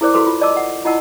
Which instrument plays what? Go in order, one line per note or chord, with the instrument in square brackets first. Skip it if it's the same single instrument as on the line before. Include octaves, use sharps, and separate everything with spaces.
[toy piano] E4 G#4 A#4 C5 D5 D6
E4 F#4 A4 B4 C6 D6
F4
D5 D#5 A5 D6 E6
F#5
E4 F4 D#5 F#5 A5 E6